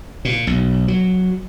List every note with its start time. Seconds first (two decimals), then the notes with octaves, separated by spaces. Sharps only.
0.25 A#2
0.47 B1
0.88 F#3